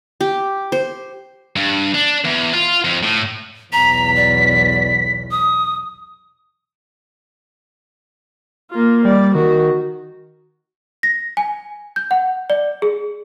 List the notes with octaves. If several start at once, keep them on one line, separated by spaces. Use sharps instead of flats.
G4
C5
G2
D4
E2
F4
F2
A2
B1 E2 A#5 B6
D5
D#6
A#3 F4
G3 D5
D#3 F#4
A#6
G#5
G6
F#5
D5
G#4